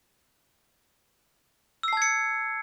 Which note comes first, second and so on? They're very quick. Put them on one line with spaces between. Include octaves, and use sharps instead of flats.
E6 C7 A5 G#6 C#7